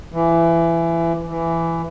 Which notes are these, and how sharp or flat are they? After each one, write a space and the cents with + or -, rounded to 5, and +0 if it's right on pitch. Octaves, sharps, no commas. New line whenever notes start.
E3 +20
E3 +10